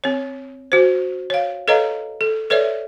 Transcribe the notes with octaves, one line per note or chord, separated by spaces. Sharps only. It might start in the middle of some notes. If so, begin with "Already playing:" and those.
C4 C#5
F#4 C5
C#5 F5
A4 B4 C#5 D#5 F5 A#5
A4
A4 B4 C#5 D5 E5